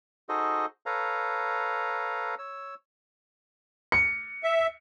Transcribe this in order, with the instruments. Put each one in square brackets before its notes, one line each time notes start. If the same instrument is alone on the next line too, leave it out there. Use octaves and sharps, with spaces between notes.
[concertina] D#4 F#4 G#4 A4 C5 D#5
A4 B4 C#5 F5 A#5
C#5 E6
[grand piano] C#7
[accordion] E5